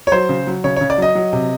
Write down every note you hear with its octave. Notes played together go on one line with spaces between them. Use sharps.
C#5
F#3 C5
C#3
F#3
C#3 C#5
C#5
C#3
D5
F#3 D#5
F#3
C3